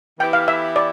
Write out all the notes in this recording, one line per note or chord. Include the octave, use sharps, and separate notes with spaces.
E3 B3 E4 G4 B4 G5
F5
E5
D5